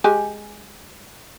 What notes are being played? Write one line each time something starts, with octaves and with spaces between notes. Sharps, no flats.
G#3 G4 G#5